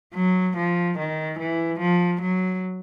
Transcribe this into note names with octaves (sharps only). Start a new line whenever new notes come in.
F#3
F3
D#3
E3
F3
F#3